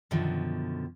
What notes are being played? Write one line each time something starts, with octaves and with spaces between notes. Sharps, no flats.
F#2 B2 D3 D#3 F3